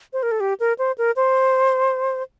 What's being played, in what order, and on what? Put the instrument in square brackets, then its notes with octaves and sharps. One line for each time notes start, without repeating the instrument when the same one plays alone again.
[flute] C5
A#4
A4
G4
A#4
C5
A#4
C5